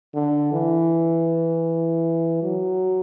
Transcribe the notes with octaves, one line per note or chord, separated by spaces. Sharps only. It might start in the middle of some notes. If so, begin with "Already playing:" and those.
D3
E3
F#3